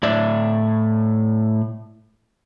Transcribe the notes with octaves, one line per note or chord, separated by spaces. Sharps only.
A2 D5 E5